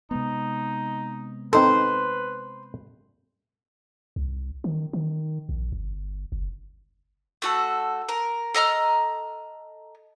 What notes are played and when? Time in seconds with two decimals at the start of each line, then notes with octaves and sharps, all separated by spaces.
0.11 C3 G#3 B3 D#4
1.53 C4 D#4 A4 B4 C5
4.16 C2
4.64 D#3
4.93 D#3
5.49 A#1
5.72 G1
6.32 F#1
7.42 A3 F#4 A4
8.09 A#4
8.55 A4 D#5 A#5 F6